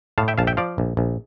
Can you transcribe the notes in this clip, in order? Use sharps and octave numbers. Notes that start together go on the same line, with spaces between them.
A2 F5 A5
E5 G5
A#1 F5 A5
E5 G5
F3 D5 F5
A#1
A#1